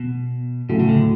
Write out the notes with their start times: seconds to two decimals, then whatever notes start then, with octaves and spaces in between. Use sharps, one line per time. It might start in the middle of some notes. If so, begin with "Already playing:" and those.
Already playing: B2
0.69 A2 C#3 F#3 A3
0.80 C#3
0.89 D2 D3